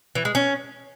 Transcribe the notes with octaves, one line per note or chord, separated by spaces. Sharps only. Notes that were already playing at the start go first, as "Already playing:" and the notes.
E3
G#3
C#4